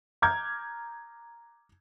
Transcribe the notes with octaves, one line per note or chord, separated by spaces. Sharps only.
A#5 D6 F6 G6 G#6